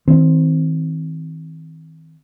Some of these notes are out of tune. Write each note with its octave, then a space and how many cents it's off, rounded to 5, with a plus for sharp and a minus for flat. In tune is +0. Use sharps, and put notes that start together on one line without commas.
D#3 +45 C4 +0